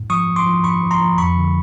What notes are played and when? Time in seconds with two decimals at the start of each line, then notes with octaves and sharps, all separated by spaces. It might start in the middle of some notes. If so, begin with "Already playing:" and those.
Already playing: G#2
0.10 F3 C#6 D#6
0.28 F3
0.36 C6 D6
0.46 F3
0.64 G#2 B5 C#6
0.82 F3
0.91 A#5 C6
1.00 F3
1.18 F2 B5 C#6
1.37 D3